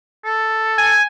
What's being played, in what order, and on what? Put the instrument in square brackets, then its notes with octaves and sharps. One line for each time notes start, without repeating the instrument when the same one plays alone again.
[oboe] A4
[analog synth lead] G#5